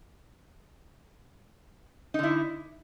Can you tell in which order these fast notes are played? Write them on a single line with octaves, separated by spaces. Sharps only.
D#4 D3 E4